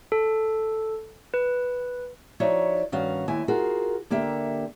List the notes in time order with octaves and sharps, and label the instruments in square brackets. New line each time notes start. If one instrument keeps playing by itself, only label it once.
[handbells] A4
B4
[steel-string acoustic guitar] F3 D#4 F#4 C#5 D5 E5
G2 D#3 C#4 F#4 F5
D#2 E4 G#5
F4 F#4 G#4 A#4
D3 A#3 G4 E5